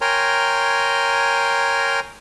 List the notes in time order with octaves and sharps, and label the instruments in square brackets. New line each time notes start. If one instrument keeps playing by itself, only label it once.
[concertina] A#4 C#5 G5 G#5 A#5 C6